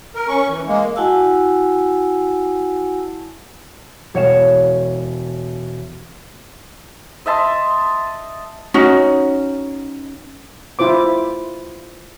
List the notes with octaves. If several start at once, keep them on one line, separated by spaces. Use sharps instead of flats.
A#4
C#4 C#6
E3
G#3 A#3
E4 F#4 F#5 G#5 A5 E6
E1 C#5 F5 E7
D#5 E5 A5 C6
C#4 D#4 F#4
E4 F4 C5 D6